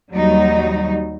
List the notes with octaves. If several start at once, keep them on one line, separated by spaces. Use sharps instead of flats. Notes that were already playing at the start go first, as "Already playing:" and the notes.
D#2 F#3 G3 D#4